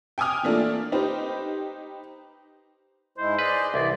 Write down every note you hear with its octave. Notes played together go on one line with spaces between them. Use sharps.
G5 G#5 D6 D#6 F6
E3 A3 A#3 D4 E4 F4
D#4 G4 B4 C5
G#2 G#3 E4 C5
G#4 B4 D5 D#5
C2 E3 D5